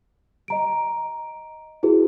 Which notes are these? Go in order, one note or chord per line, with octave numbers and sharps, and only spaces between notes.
D#5 A#5 D7
E4 F#4 G#4 B4